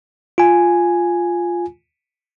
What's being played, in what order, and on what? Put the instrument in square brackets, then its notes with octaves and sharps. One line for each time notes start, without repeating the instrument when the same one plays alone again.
[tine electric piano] F4 G#5